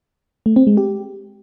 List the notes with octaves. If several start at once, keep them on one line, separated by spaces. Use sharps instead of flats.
A3
C4
G#3
G4